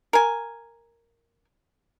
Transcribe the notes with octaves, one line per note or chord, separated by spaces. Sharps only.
A#4 G#5